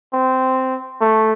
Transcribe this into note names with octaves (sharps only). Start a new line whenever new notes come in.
C4
A3